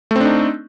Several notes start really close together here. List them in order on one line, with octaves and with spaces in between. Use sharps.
A3 C4 D4 D#4